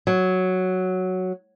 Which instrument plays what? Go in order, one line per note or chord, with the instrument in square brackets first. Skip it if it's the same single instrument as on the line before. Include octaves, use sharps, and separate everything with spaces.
[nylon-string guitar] F#3